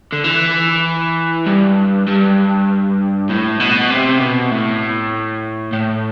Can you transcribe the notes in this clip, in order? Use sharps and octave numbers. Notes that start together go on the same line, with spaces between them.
D3
E3
G2
G2
A2
B2
C3
B2
A2
A2